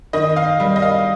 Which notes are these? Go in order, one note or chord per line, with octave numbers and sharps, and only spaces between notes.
D#3 D#5
F5
G3
D#5
F5